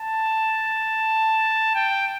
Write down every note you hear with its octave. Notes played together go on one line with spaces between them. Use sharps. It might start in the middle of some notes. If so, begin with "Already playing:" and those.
Already playing: A5
G5